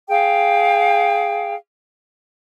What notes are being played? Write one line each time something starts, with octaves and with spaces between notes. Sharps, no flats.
G#4 F5 G5